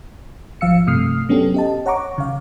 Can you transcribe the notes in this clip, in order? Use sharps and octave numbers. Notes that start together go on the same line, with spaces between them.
G#1 F3 F5 E6 C#7
G2 C3 A3 D#6 F6 C7
F#3 B3 C#4 D4 G4 A4
G4 D#5 A5
C#5 F#5 A#5 C#6 D6
C#3 F5